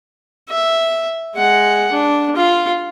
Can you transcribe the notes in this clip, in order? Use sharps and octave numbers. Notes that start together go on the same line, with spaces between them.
E5
G#3 F#5
D4
F4